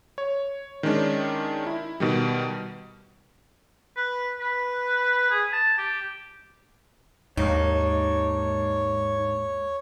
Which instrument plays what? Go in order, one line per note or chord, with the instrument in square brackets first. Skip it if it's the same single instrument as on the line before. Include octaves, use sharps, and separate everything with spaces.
[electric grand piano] C#5
D#3 G#3 C#4 D4
E4
B2 D#3 G3
[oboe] B4
B4
G#4
A5
G4
[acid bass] D#2 [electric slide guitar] G#2 A#3 D4 [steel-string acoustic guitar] D#4 [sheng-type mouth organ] C#5